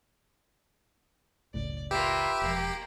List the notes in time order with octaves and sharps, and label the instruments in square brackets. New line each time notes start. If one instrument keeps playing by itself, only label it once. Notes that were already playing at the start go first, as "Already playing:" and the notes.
[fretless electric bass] F#1 C#2 A2 [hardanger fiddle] D5
[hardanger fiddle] A#3 F4 [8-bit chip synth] G4 [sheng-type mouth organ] B4 E5
[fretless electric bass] E1 F3 [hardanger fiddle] A#3